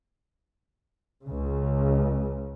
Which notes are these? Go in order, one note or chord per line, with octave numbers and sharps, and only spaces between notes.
C#2 C#3